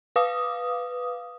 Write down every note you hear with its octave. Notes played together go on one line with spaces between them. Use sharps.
B4 F5 D6 D#6